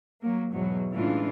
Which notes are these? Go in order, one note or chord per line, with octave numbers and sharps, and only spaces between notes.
F#3 A#3
E2 G#2 B2 F#3
A2 C#3 E3 G#3 D4 F4